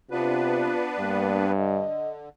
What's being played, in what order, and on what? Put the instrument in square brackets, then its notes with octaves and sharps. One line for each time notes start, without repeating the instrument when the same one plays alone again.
[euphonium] C3 [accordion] B3 D4 B4 [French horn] F4
[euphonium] G2 [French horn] A#3
[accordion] D3 [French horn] D#5